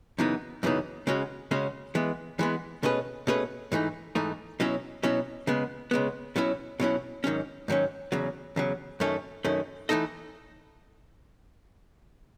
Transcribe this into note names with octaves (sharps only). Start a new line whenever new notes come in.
F#2 C#3 E3 B3 D#4
F#2 C#3 E3 B3 D#4
C#3 G#3 C#4 F#4
C#3 G#3 C#4 F#4
E3 G#3 B3
E3 G#3 B3
B2 A3 C#4 G#4 B4
B2 A3 C#4 G#4 B4
G#2 E3 A3 D#4
G#2 E3 A3 D#4
B2 F#3 C#4 E4
B2 F#3 C#4 E4
C#3 G#3 B3
C#3 G#3 B3
B2 F#3 C#4 E4
B2 F#3 C#4 E4
G#2 D#3 F#3 C#4
G#2 D#3 F#3 C#4
E2 C#3 F#3
E2 C#3 F#3
F#2 D#3 A3 C#4
F#2 D#3 A3 C#4
E3 A3 D#4 A4 D#5